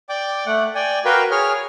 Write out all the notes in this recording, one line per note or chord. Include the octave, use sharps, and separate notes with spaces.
D5 G5 D6
A3 F#5
D5 G5 G#5
F#4 A#4 B4 F5 G5
G#4 C#5 F6